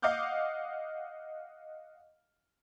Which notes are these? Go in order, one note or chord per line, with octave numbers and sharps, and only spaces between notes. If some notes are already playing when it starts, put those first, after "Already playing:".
D#5 F5 F#5 D6 F6 G6